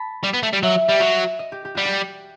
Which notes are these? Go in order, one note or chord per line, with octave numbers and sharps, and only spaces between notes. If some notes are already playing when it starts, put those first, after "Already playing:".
Already playing: A5 B5
G3
B3
A3
G3
F#3 E5
G3
F#3
D#5
G4
G4
G3 F#4
G4